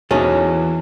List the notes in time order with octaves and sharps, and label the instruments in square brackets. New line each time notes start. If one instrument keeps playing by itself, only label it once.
[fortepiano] E2 B2 [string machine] E3 [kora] C#4 [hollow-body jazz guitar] D#4 G#4 A4